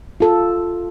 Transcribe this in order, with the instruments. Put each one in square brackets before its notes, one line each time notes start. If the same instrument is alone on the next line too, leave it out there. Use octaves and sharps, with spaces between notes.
[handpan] F4 A4